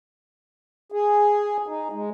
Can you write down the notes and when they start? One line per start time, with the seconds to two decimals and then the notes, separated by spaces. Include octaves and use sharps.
0.92 G#4
1.67 D#4
1.92 G#3